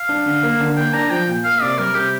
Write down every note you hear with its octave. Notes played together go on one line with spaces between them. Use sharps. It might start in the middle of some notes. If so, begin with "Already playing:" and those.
Already playing: F5
D4
D3
A#3
D3
A#3 G5
D4 A#5
F3 G5
A#2
A#3 F5
C3 D5
G3 A#4
C3 G4